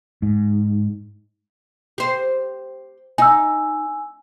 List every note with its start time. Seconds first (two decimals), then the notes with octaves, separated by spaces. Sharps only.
0.22 G#2
1.98 G4 C5
3.18 D#4 G#5 E6